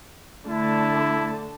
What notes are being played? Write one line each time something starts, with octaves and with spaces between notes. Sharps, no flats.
D3 A3 E4 A5